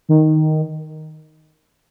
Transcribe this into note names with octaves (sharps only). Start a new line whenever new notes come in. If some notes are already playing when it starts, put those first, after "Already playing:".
D#3